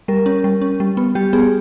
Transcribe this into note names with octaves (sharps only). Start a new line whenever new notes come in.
G3 A#4
C#4
G3
C#4
G3
B3
G3 G4
B3 G#4